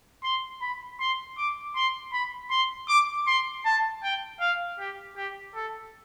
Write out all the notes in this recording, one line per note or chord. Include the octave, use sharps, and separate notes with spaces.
C6
B5
C6
D6
C6
B5
C6
D6
C6
A5
G5
F5
G4
G4
A4